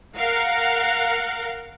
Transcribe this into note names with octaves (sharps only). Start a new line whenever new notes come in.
A#4 F5 F#5